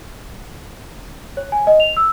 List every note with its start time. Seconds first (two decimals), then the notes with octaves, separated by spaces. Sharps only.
1.37 C#5
1.52 G#5
1.67 D#5
1.80 F7
1.97 E6